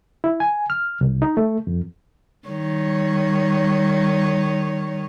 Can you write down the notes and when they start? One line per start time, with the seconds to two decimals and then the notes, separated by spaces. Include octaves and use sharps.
0.24 E4
0.40 G#5
0.70 F6
1.01 C2
1.22 D#4
1.37 A3
1.67 F2
2.48 D#3 G3 C#5